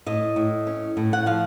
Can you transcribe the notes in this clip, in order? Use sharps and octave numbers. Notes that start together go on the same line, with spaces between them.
A2 D#5
A2
C#4
A2
F#5
F3 F5